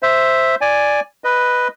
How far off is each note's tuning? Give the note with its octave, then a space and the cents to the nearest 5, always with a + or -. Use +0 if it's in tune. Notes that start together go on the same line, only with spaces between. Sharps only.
C5 +0 E5 +0
D5 +0 G#5 +0
B4 +0 D#5 +0